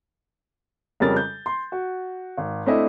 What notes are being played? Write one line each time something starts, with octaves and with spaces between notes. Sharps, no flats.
F2 C#3 G3 C#4 A#4 A6
G6
C6
F#4
G#1
A3 C4 D4 E4 D#5